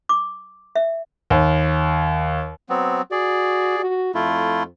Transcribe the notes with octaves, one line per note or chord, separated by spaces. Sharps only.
D6
E5
D#2
F#3 B3 C4
F#4 G#4 D5
F#4
F2 A3 E4 F4